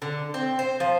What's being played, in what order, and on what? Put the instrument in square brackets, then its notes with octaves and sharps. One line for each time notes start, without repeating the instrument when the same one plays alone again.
[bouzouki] D3
C4
C5
F3 C5